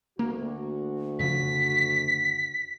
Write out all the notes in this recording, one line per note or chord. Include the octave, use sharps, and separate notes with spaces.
D2 A#3 F#4
F2 C#3 F3 B6